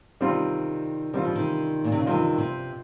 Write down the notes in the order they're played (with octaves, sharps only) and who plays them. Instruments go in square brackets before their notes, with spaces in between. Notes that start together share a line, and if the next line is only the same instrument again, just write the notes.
[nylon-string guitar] C3 D#3 [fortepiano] G3 C4 F4
[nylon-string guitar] D#3 [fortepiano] G3 C4 F4
[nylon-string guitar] F3
C3 D#3
A#2
C3
C#3
[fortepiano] G2 F3 C4 F4 [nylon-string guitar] C3 D#3
[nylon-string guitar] C3